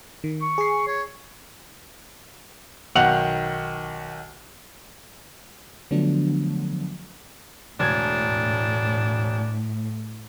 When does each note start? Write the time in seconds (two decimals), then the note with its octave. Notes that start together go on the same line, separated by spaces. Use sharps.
0.24 D#3
0.42 C#6
0.58 G#4 C7
0.87 C#5
2.95 B1 D#3 F#5 F#6 F7 F#7
5.91 D3 F3 F#3 A3 B3 D4
7.80 E1 A2 D4 G#6